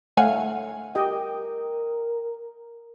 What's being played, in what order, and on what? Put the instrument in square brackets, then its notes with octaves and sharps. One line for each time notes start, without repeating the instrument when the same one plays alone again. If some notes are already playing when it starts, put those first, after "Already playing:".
[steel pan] A3 F5 [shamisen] C#5 F#5 G#5
[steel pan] G4 D#5 G5 [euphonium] A#4